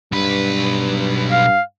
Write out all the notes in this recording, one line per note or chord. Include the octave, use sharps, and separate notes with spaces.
B1 G2 B4
F5